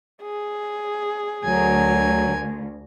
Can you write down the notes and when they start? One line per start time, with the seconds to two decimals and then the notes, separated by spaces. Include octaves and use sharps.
0.22 G#4
1.44 D2 F#3 A#4 G#5